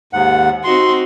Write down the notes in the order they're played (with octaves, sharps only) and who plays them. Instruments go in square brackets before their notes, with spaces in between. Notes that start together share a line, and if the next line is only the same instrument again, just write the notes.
[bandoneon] D#2 G#2 F#5
[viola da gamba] C4 D#4 F#4 [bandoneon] C6